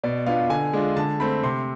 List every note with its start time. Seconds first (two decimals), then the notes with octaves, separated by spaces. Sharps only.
0.04 B2 D5
0.26 B3 D4 F4 F5
0.50 D3 G#5
0.73 G#3 D4 F4
0.97 D3 A5
1.20 A3 C4 B5
1.43 C3 C6